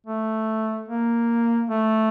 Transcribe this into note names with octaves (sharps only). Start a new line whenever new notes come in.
A3
A#3
A3